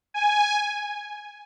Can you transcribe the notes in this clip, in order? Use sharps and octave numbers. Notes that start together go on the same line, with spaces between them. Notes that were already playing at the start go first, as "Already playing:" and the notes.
G#5